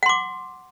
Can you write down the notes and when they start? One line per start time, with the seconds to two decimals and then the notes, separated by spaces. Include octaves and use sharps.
0.03 F#5
0.06 C6
0.09 D6